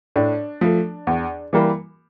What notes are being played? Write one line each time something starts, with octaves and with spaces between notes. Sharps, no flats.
A2 D4
F3 A3
E2
E3 G3 A#3